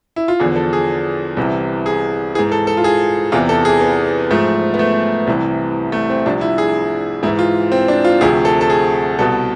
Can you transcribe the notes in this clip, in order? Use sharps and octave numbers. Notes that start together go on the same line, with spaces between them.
E4
F4
E2 D3 F3 G#4
A4
G#4
C2 C3 E3
G#4
G#2 E3 G#4
A4
A4
F4
G#4
E2 C3 E3 F4
A4
G#4
B3
G#2 F3 A3
B3
A3
C2 C3 E3
A3
C4
C2 C3 F3 D4
E4
G#4
G#2 E3 E4
F4
C4
D4
F4
D2 C3 F3 G#4
A4
A4
G#4
C2 B2 A4